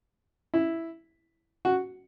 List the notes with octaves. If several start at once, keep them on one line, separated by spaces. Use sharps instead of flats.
E4
F#4